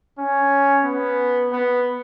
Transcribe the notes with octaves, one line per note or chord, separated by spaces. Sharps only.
C#4
B3
B3